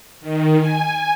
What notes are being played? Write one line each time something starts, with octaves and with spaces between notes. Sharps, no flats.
D#3
G#5